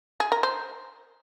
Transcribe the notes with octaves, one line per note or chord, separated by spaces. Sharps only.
G#4
A#4
C5